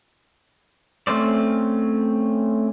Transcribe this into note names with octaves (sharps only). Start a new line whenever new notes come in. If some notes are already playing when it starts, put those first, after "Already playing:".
A3 C4 C#4 C5 D5